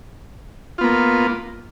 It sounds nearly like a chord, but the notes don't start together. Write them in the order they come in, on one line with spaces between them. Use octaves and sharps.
F4 B3 A#3